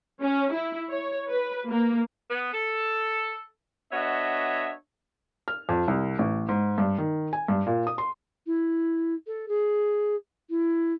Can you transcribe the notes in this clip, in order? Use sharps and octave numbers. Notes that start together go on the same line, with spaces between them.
C#4
E4
C#5
B4
A#3
B3
A4
B3 D4 F#4 C#5 D#5 E5
F6
F2
C2
A1
G#2
G2
D#3
G#5
G2
A#2
D#6
C6
E4
A4
G#4
E4